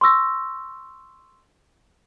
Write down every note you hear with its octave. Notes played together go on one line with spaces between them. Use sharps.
C6 C#6 E6 A#6